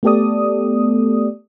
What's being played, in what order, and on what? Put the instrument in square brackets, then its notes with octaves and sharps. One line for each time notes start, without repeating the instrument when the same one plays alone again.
[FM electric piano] A3 B3 G4 A4 D5 D#6